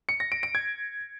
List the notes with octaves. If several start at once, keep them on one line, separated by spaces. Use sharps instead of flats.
C#7
A#6
D7
D7
G#6